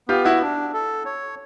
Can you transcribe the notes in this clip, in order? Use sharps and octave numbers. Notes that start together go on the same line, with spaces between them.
B3 F4 G4
E4 F#4
D4
A4
C#5